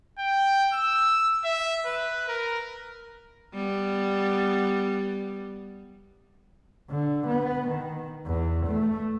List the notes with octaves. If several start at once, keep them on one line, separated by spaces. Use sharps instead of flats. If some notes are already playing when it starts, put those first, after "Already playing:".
G5
E6
E5
B4
A#4
G3 B3
D3
B3
D#3
E2
A3